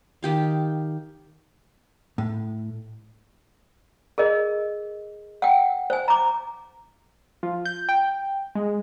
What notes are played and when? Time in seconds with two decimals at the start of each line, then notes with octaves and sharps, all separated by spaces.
0.23 D#3 G4 F5
2.18 A2
4.18 G#4 A#4 D#5
5.42 F#5 G5
5.90 C5 G#5
6.08 A#5 D6
7.43 F3
7.65 G6
7.89 G5
8.55 G#3